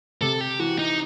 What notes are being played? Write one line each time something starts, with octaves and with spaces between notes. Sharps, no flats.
C3 A4
G4
E3 F#4
D#4